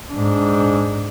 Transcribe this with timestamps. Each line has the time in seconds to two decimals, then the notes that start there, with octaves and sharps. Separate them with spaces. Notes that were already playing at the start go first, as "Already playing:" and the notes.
0.12 G#2 D4